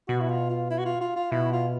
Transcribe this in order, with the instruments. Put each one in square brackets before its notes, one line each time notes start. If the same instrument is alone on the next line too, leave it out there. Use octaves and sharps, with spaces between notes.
[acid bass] B2 [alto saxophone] F#4
[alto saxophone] E4
F4
F4
E4
F#4
F4
F4
F4
[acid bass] B2 [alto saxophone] E4
[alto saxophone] F4